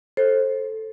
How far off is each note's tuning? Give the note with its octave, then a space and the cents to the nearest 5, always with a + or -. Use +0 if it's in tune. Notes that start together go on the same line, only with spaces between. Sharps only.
A4 +0 C5 +25